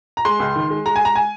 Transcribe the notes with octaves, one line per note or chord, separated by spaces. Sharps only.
A#5
G#3 C6
C#2
D#3
G#3
G#3 A#5
G#5
G#3 A#5
G#5